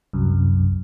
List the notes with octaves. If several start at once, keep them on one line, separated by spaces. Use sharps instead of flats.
C2 F#2